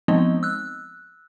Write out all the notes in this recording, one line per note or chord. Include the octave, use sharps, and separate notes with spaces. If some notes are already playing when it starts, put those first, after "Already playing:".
F3 G#3 B3 C4 D#4 D#5
E6 F#6